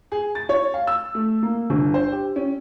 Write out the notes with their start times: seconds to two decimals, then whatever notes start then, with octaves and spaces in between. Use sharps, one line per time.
0.12 G#4
0.35 A6
0.49 C#5
0.74 F5
0.87 E6
1.15 A3
1.43 A#3
1.70 G1
1.94 C5
2.12 G4
2.36 C#4